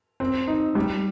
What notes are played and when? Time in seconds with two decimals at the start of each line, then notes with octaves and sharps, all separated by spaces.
0.20 C4
0.48 D#4
0.75 G3